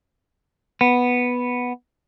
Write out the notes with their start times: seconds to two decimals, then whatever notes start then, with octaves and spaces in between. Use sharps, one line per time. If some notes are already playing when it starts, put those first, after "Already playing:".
0.81 B3